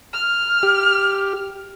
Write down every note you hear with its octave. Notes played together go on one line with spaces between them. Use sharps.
F6
G4